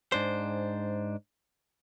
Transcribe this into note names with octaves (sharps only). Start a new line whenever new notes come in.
G#2 D4 C5